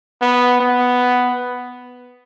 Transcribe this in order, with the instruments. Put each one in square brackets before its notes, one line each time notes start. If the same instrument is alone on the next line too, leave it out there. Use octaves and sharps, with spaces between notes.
[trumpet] B3
B3